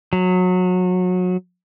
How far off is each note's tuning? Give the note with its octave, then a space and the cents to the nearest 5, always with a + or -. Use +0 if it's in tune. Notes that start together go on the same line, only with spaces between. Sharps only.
F#3 -25